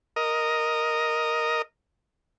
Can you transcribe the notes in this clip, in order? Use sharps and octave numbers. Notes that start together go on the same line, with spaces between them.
A#4 D#5